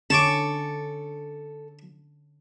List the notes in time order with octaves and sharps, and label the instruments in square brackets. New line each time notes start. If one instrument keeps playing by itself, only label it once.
[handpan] D3 C#4 [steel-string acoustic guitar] A4 [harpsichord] A5 C#6 D6